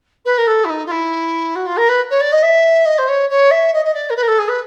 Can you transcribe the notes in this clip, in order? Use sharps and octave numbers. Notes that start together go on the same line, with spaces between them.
B4
A#4
A4
E4
D#4
F4
E4
F#4
F4
A#4
B4
C#5
D5
D#5
E5
D#5
C5
C#5
C#5
E5
D#5
D#5
D5
A#4
B4
A#4
A4
G#4
B4